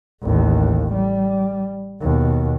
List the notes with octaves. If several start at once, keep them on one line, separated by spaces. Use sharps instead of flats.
A1 D#2
G3
D#2 B2